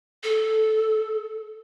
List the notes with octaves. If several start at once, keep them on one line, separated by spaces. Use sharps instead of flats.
A4